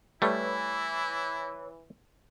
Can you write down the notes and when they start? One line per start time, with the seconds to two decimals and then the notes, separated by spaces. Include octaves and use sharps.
0.22 E3 G3 A3 E4 B4 C#5